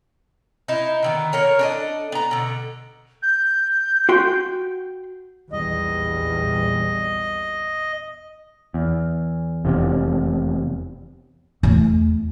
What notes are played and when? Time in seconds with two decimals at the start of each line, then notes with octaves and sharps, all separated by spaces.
0.68 D#4 E4
1.03 D3 D#3 B3
1.33 A#3 A#4 C#5
1.59 D4 A4 D#5
2.12 B3 A#5
2.31 B2 D3
3.22 G6
4.09 F#4 G5 C6
5.53 A#1 E2 G3 D#5
8.74 E2
9.65 F1 E2 C3
11.63 E2 A3